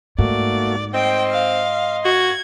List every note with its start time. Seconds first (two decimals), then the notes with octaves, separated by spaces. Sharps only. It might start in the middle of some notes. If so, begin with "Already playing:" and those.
0.19 G#2 A3 A#3 F#4 D5
0.94 C4 D#5 G5 C6
1.31 F5
2.05 F#4 G#6